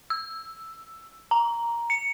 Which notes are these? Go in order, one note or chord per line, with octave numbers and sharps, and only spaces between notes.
E6
A#5
C#7